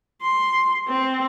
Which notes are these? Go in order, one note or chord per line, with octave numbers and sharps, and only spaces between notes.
C6
C4